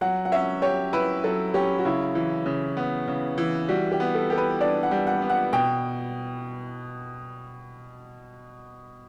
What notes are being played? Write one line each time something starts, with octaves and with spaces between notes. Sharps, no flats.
F#3 F#5
F#5
C#4 E5
G4 C#5
E4 B4
F#3 A4
C#4 G4
F#4
C#3 E4
E3
C#3
B3
C#3
E3
G3 F#4
G4
B3
A4
G4 A4
B4
D4 D5
F#5
G3
F#5
B3
F#5
B2 G5